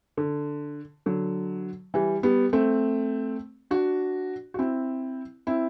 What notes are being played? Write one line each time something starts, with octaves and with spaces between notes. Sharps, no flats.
D3
D3 F#3
E3 G3
G3 B3
A3 C4
D4 F#4
F#4
C4 E4
C4 E4